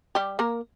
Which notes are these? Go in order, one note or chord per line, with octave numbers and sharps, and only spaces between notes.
G3 G4
A#3 A#4